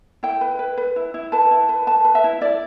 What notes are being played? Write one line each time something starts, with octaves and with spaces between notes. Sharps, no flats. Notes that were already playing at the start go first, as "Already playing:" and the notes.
E4 G5
B4
B4
B4
E4
E4
B4 A5
E4
B4
B4 A5
B4
E5
E4
E4 D5